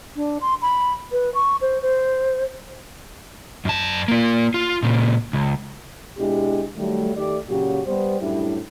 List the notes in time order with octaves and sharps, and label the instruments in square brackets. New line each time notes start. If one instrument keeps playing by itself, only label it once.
[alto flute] D4
C6
B5
B4
C#6
C5
C5
[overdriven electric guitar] F#2 A5
A#3 F4
F4
A#2 C#3
C#2
[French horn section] B2 G#3 D4 E4 G4
D#3 F#3 G3 A3
D#3 A3 G4 D5
A#2 C#3 F#3 F#4 G4
G3 B3 C5
F#2 A2 G3 D4 E4